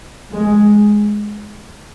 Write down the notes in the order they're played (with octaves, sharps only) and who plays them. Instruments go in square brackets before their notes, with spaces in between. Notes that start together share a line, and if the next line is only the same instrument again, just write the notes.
[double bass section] G#3